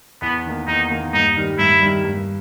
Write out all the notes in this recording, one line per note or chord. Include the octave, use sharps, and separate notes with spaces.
E2 B3
D#3 A#3
E2 D#4
D#3 A#3
G2 D#4
D#3 G3
G2 E4
D#3 G3
G2